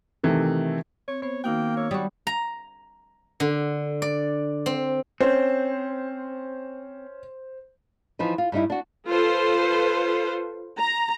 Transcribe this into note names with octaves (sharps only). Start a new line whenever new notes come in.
C3 D#3 E3 A3
C4 C#5
B3 C5 C#5
D#3 A#3 D#4 F#4 G5
C#5 E6
G3 F#4 D#6
A#5
D3
D5
C4
C4 C#4 C5
E3 F3 D#4 B4
F4
G2 G3 D#4 E4
D4 F#4
F4 A4 B4 C5
A#5